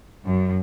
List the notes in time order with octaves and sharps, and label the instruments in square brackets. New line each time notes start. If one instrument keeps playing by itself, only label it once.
[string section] F#2